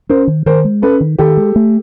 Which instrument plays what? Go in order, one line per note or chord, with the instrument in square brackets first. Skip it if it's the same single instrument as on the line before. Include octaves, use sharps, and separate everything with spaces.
[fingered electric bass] C#4 [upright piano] A#4 C5
[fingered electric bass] D#3
[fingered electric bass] D#3 [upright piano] A#4 C5
[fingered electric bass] G#3
[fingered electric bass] C#4 [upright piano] A4 B4
[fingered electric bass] D#3
[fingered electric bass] D#3 [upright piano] G4 A4
[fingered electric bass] G#3
A3